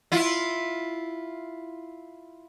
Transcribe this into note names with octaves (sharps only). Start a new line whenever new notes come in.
E4 F4